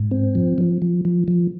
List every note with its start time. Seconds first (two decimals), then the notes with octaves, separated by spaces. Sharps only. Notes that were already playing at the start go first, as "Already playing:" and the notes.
Already playing: G#2
0.11 C4
0.35 F3
0.58 F3
0.82 F3
1.05 F3
1.28 F3